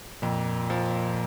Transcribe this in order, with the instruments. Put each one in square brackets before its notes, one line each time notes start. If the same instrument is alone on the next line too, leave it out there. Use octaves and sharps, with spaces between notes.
[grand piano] F2 [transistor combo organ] A#2
[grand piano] F3